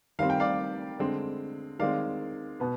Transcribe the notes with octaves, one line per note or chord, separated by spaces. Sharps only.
D#3 G3 C4 F5
G5
D5 F5
D3 G#3 C4
D#3 G#3 C4 D5 F5
B2 B3